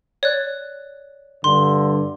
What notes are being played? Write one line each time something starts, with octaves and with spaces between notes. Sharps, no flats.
C#5 D5 F#6
G2 D3 C6